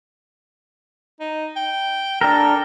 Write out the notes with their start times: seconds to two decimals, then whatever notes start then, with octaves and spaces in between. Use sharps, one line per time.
1.20 D#4
1.56 G5
2.21 D4 A4 A#4 G5